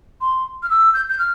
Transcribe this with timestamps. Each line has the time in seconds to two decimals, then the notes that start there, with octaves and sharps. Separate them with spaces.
0.21 C6
0.63 F6
0.70 E6
0.94 G6
1.10 G6
1.19 F6